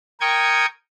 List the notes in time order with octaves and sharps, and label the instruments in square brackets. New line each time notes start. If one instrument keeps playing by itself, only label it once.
[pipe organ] A#4 G5 C#6 D#6 G#6